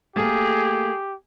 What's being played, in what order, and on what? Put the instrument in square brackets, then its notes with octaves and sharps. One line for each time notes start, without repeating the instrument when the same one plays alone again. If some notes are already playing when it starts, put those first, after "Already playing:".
[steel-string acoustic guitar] A3 A#3 [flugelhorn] G4 [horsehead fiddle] G#4